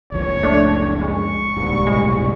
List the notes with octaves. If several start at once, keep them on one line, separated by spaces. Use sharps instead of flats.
F#1 C#2 F3 C#5
A3 D4
G#3 C#6
D1 C2 G#2 B3
F1 B1 A2 G#3